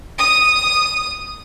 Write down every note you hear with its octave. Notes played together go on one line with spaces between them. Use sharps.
D#6